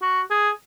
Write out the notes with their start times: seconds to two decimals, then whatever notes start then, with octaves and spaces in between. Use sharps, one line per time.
0.02 F#4
0.30 G#4